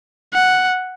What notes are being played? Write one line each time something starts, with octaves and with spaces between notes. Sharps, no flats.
F#5